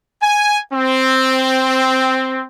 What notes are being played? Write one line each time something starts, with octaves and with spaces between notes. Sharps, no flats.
G#5
C4